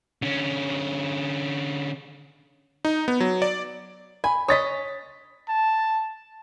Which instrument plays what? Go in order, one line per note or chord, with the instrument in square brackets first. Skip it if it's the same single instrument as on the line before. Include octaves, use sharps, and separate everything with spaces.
[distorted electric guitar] D3 C#4
[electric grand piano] D#4
B3
F#3
D5
[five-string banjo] G#5 [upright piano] B5
[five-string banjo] C#5 D#5 [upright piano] D#6 A6 B6
[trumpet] A5